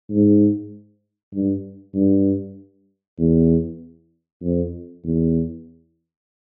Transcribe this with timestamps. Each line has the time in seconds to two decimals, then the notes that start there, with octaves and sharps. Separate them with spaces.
0.10 G#2
1.34 G2
1.95 G2
3.19 E2
4.42 F2
5.04 E2